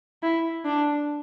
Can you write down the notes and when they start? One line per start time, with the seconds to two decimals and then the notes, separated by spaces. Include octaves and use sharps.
0.23 E4
0.65 D4